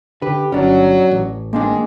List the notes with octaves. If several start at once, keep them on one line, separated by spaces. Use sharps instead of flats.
D3 G4 B4
G1 F#3 C#4 D4
A1
G#3 A#3 C4 D4